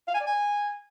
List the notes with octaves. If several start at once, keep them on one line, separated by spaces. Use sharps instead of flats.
F5
G#5
D5
G#5